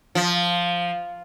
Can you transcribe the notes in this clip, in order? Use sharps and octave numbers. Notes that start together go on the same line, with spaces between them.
F3